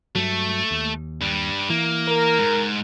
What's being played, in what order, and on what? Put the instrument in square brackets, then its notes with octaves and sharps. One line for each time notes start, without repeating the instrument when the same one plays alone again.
[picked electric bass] G2 F#3 [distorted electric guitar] A3
[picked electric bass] D#2
[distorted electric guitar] G2 G3
[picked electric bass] E3 [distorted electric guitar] A#3
[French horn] A#4
[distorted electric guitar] G#2